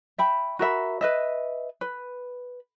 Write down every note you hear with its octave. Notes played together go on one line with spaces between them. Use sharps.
E5 G5 B5
F#4 A#4 E5 B5
B4 D#5 E5
B4